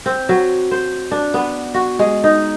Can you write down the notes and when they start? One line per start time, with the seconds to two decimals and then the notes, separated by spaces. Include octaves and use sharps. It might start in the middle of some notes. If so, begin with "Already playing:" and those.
0.06 C4
0.29 F#3
0.71 C5
1.11 D4
1.34 B3
1.74 F#4
1.99 G#3
2.24 D#4